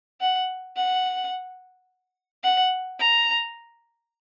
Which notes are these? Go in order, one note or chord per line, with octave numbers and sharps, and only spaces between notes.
F#5
F#5
F#5
A#5